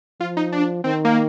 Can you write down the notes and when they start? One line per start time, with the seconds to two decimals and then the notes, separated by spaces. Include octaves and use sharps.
0.20 F3 F4
0.37 D#4
0.52 D4
0.84 D#3 C4
1.05 A#3